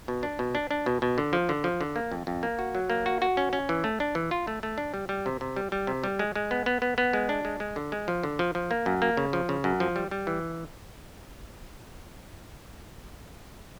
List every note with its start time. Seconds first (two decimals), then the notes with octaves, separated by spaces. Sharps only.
0.08 B2
0.23 D4
0.39 B2
0.55 D4
0.71 D4
0.86 B2
1.02 B2
1.18 D3
1.33 F3
1.49 D3
1.64 F3
1.81 D3
1.96 A#3
2.12 F2
2.27 F2
2.43 A#3
2.59 F#4
2.75 F#3
2.90 A#3
3.06 F#4
3.22 F#4
3.37 C#4
3.53 C#4
3.69 E3
3.84 A3
4.00 D4
4.15 E3
4.31 F4
4.47 A3
4.63 A3
4.78 D4
4.94 G3
5.09 G3
5.26 C3
5.41 C3
5.56 G3
5.72 G3
5.87 C3
6.04 G3
6.19 G#3
6.36 G#3
6.51 B3
6.66 B3
6.82 B3
6.98 B3
7.13 G#3
7.29 D4
7.45 G#3
7.60 G#3
7.76 D3
7.92 G#3
8.08 F3
8.23 D3
8.39 F3
8.55 F3
8.71 A#3
8.86 F#2
9.02 A#3
9.17 C#3
9.33 F3
9.49 C#3
9.64 F#2
9.80 F3
9.96 G3
10.11 G3
10.27 E3